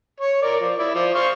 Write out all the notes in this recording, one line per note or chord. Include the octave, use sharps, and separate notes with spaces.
C#5
A#4 D5
F3
E4 D5
F3
C5 F5 C#6